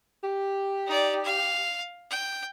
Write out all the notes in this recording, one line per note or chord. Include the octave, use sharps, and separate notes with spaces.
G4
D#4 D5
F5
G5